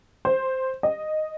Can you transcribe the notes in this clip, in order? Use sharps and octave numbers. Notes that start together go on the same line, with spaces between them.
C5
D#5